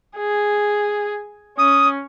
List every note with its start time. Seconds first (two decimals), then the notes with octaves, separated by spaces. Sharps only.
0.17 G#4
1.58 C#4 D#6